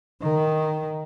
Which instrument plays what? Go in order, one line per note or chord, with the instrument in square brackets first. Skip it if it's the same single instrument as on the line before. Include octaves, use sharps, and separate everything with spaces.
[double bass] D#3